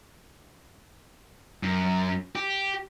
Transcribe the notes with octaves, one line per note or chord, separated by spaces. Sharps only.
F#2
G4